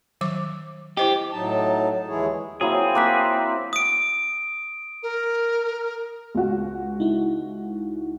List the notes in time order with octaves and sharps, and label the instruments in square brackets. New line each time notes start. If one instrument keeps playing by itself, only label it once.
[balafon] D#3 F#3 D6
[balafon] E4 C5 D#5 [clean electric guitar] G4
[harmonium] A2 F#3 D#4 A5
D#2 E3 G#3 E4 G#4 C#5
[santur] F#3 A#3 E4 [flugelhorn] C4 [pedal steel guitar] G#4
[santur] A#3 E6 [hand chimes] D6 F#6 B6
[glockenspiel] D#6 D7
[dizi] A#4
[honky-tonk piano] C#2 F#4
[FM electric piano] D#4 E4